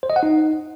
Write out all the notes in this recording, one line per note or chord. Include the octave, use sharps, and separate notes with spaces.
C5
D#5
F#5
D#4